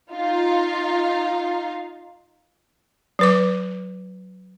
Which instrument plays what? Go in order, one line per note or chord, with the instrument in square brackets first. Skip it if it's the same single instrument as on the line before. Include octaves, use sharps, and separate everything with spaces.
[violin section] D#4 F4 F5
[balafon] F#3 B4 D6